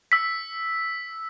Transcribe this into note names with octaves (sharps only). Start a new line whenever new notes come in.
E6 B6